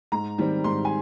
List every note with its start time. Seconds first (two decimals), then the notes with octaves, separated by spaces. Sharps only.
0.12 G#2 A#5
0.38 D#3 G3 C4
0.64 G#2 C6
0.85 G#5